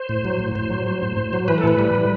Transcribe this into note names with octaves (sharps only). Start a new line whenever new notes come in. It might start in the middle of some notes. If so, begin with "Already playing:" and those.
Already playing: C5
A2
F#3
A2
A2 C5
F#3
F#3
A2
A2
F#3
E3 B4
A4
A2 B4
G3
E3